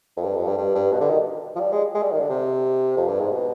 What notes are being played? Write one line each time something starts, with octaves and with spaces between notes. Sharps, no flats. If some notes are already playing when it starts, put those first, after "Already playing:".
F2
G2
F2
G2
G2
G2
B2
D3
D#3
F3
G3
G#3
G#3
G3
D#3
D3
C3
F2
G2
G#2
B2